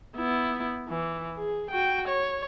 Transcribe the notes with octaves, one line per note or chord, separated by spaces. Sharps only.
B3 E4
E3
G#4
F#4 G5
C#5